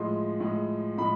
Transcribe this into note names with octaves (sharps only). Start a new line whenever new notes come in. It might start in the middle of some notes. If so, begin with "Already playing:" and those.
Already playing: A2 F3 G#3 C6
A2 F3 G#3
A2 F3 G#3 B5